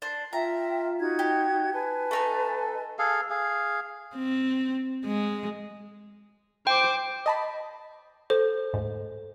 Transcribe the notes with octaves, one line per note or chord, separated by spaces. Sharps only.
D4 C5
F4 E5 G5 A#5
D#4 F#4 G#6
G4
B4 G#5 A5
A3 D#4 A4
G#4 A4 F5
G#4 F5
C4
G#3
C5 G5 D6
D#5 A5 B5
A4 C5
D2 G#2